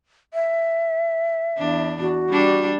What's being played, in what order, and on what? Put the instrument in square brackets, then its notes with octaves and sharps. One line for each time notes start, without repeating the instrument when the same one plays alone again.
[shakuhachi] E5
[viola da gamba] E2 D4
[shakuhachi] F#4
[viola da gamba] G3 D4